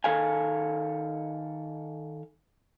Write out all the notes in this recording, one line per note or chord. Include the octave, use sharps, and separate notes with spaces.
D#3 A4 F5 G#5